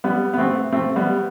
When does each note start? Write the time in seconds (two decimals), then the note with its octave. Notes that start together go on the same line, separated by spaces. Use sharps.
0.04 G3 B3
0.34 B3
0.38 A3 C4
0.72 A3 C4
0.96 G3 B3